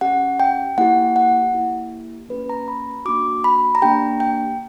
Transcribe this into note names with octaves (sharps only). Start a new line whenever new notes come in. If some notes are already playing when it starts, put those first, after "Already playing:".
C#4 G4 F#5
G5
A#3 E4 G4 F#5
F#5
A#3 E4 G4
A#3 C#4 G4 B4
A#5
B5
A#3 D4 F#4 D6
B5
A#5
A#3 D4 G4 G5
G5